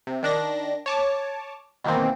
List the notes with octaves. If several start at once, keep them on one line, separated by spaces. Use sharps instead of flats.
C3
D#3 D4 A#6
C#5 A5 D6
B2 D#3 E3 A#3 C4